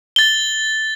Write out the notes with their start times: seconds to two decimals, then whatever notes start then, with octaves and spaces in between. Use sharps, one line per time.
0.16 A6 G7